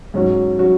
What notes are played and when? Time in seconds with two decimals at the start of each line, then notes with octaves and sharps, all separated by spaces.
0.14 G#2 F#3 C#4 F#4
0.58 F#3 C#4 F#4